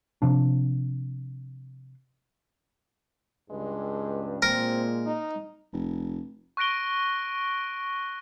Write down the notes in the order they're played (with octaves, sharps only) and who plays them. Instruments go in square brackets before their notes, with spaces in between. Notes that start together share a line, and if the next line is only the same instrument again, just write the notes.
[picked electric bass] C3 F3 D4
[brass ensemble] C#2 G2 [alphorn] G#3
[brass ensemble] A#2 G#3 [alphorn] C4 [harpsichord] A#4
[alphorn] D#4
[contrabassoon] F1
[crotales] C#6 F#6 A#6 D7 G7